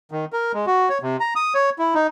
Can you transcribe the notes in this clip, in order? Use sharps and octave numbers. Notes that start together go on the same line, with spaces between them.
D#3
A#4
G#3
F#4
C#5
C3
A#5
D#6
C#5
E4
D#4